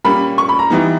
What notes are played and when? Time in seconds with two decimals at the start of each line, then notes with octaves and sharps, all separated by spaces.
0.04 A#2 G3 A#3 C#4 B5
0.38 C#6
0.49 B5
0.59 A#5
0.70 E3 G3 B3 D#4